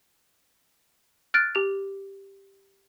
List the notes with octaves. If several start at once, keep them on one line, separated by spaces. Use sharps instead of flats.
F6 F#6 A6 D7
G4 F7